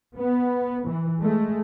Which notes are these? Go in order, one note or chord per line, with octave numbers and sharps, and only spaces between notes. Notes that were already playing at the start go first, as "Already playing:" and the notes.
B3
E3
G#3 A3